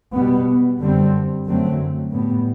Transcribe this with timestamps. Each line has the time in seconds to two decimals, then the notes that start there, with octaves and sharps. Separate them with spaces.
0.12 B2 G3 B3
0.79 F#2 D3 G3 C4
1.46 F#2 D3 F#3 A3 C4
2.11 A2 G3 B3